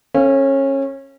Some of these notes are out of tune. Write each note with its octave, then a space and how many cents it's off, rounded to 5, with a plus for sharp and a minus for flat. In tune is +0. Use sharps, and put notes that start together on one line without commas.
C#4 -25 A4 +0 F5 -10